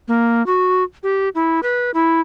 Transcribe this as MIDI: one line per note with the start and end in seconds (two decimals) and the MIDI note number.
0.08 0.45 58
0.46 0.83 66
1.03 1.29 67
1.35 1.60 64
1.63 1.91 71
1.94 2.21 64